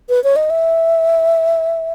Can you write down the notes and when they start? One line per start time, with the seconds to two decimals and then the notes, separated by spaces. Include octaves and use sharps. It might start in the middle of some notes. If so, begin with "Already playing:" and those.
0.09 B4
0.24 C#5
0.36 D#5
0.50 E5